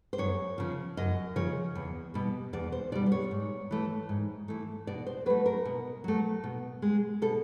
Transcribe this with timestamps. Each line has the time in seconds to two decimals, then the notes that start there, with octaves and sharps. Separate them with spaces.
0.13 C5
0.18 F#2 C#5
0.58 C#3 F3
0.97 F#2 D#5
1.36 C#3 F3 C#5
1.75 E2
2.14 B2 G3
2.53 E2 D5
2.72 C5
2.92 B2 G3 D5
3.06 C5
3.12 C#5
3.31 G#2
3.71 E3 A3
4.09 G#2
4.48 E3 A3
4.87 B2 D5
5.07 C5
5.26 F#3 A3 B4
5.46 A#4
5.65 B2
6.04 F#3 A3
6.44 B2
6.82 G#3
7.22 B2 A4